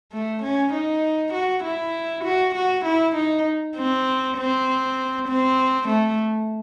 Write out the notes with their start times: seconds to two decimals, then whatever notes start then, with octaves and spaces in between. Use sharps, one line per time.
0.13 A3
0.43 C#4
0.73 D#4
1.34 F#4
1.64 E4
2.25 F#4
2.55 F#4
2.85 E4
3.15 D#4
3.76 C4
4.37 C4
5.28 C4
5.88 A3